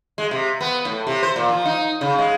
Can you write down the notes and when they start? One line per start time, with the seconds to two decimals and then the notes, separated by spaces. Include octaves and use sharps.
0.18 G#3
0.31 C3
0.61 B3
0.85 A2
1.07 C3
1.23 C5
1.36 A#2
1.48 F3
1.65 D#4
2.01 C#3
2.18 G#3